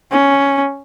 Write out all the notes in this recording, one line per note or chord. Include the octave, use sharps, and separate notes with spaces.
C#4